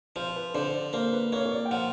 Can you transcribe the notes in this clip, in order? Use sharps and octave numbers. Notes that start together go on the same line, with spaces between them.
F3 C5
B4
D3 C5
D5
A#3 C5
B4
A#3 C#5
C#5
D5
G5
F3 F#5